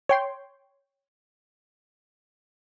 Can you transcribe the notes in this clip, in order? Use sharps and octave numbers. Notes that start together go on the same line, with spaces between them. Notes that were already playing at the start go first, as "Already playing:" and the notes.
C#5 G5 C6